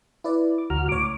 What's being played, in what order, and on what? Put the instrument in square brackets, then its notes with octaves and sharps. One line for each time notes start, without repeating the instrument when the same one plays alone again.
[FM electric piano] E4 B4 D5
D6
[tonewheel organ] D2 F#4 F6 [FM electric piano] A#5
[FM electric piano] C#2 A2 C#5 [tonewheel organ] D6